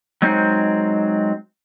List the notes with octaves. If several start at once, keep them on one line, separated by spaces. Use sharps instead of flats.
F#3 G#3 C4 D#4 C5